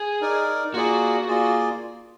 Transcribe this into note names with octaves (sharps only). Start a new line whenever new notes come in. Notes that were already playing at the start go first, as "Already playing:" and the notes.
Already playing: G#4
D#4 A#4 D5
A#3 F4 F#4 G#4 D5
A#3 F4 G#4 D5